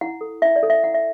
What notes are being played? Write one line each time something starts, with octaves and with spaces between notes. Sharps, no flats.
E4 F#5
A4
E4 E5
D5
A4
E5
E4 F#5
E5